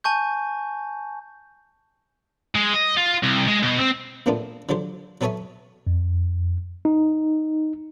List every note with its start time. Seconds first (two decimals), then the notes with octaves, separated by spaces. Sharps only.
0.04 G#5 A5 C#6 G6
2.55 G#3
2.73 D#5
2.97 F4
3.23 C2
3.48 G#3
3.63 B2
3.79 C4
4.26 A#1 A2 A#3 B3 D4 F4
4.69 D3 F3 F#3 G4 C5
5.21 F#3 B3 A4 C#5 E5 G#5
5.87 F2
6.85 D#4